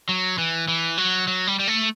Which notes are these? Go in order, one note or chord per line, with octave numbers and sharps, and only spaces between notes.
F#3
E3
E3
F#3
F#3
G3
G3
A3